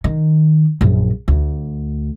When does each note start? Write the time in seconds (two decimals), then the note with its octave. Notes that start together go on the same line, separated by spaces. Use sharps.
0.04 D#3
0.81 A#1 F#2
1.28 D2